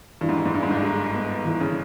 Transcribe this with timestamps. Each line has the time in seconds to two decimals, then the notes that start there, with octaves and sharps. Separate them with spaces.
0.21 G2 E3
0.29 G#2
0.37 G2
0.46 G#2
0.52 G2 D#4
0.63 G#2
0.71 G1 G2
0.82 G#3
1.14 B3
1.45 E3
1.60 C#3